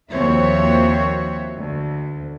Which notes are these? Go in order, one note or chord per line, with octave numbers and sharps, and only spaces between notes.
D#2 F3 C4 F#4 C#5 E5
D2